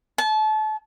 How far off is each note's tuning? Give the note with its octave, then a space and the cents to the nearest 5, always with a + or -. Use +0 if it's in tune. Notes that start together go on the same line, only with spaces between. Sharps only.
A5 -30